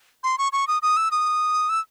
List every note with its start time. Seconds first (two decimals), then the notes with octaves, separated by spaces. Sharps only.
0.24 C6
0.38 C#6
0.53 C#6
0.68 D#6
0.82 D#6
0.97 E6
1.11 D#6
1.69 E6